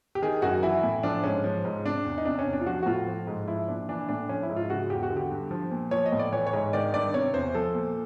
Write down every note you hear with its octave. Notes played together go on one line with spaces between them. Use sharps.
G4
D#3 G#4
F#2 F#4
E3 E4
A2
F3 D4
G#2 C#4
F3
G#2
C3 D4
E2
D#4
C3 D4
C#4
E2
D4
F4
F3 F#4
F#4
A2 F4
F3
G#2
F3 E4
A#2 D4
E3 D4
A2 D4
F3 C#4
E4
G#2
F4
C#3 F#4
E2 G4
F#4
D3
G4
G2
F3
A#2
F3 C#5
D#5
A2
D5
E3 C#5
C#5
G#2
D#3 D5
G2 D5
C3 C#5
E2 C5
F3 A4
A#2